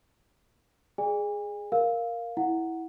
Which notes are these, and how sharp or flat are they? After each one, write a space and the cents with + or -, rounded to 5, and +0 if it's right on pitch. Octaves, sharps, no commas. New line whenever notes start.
G#4 +0 D5 +35 G#5 -40
A#4 +0 F5 +0
E4 -10 F#5 +0